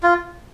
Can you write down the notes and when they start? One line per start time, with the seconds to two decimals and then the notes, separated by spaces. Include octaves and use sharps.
0.03 F4